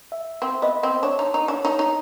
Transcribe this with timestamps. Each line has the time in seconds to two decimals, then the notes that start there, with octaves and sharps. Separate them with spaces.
0.12 E5
0.42 C4
0.62 B3 D#5
0.83 C4 D#5
1.03 D4 C#5
1.19 D#4
1.34 D#4
1.48 D4
1.65 D#4
1.79 D#4